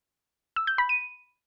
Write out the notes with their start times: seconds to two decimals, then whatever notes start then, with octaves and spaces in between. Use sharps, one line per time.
0.56 E6
0.67 G6
0.78 B5
0.89 D#7